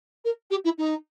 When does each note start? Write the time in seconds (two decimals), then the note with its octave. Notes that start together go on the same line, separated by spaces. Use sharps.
0.24 A#4
0.50 G4
0.64 E4
0.78 D#4